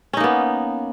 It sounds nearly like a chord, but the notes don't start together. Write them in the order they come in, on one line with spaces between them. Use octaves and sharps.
C#4 D#4 A#3 B3